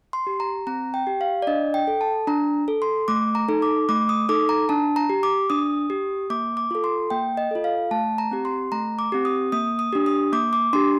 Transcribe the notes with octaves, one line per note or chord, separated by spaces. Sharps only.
C6
G4
A#5
C4 A#5
G5
G4
F5
D5
D4 D#5
G5
A4
A5
D4 A#5
A4
C6
A3 D6
A#5
D#4 A4
D6
A3 D6
D#6
D#4 A4 D6
A#5
D4 A5
A#5
G4
D6
D4 D#6
G4
A#3 D6
D6
F4 A4
C6
A#3 G5
D#5
F4 A4
F5
A3 A5
A#5
C4 G4
C6
A3 A#5
D6
C4 G4
D#6
A#3 D#6
D#6
D4 G4
D#6
A#3 D6
D6
D4 G4 C6